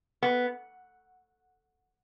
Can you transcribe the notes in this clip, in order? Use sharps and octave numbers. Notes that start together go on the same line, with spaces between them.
B3